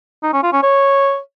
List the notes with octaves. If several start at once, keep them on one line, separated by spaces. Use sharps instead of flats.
D#4
C#4
F4
C#4
C#5